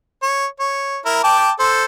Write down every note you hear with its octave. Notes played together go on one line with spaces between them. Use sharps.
C#5
C#5
E4 A#4
G5 A5 D6
A4 C5